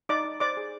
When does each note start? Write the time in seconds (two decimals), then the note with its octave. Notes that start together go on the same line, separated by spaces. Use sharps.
0.09 D#4 D5 D6
0.25 D#4
0.40 C5 D5 D6
0.57 G#4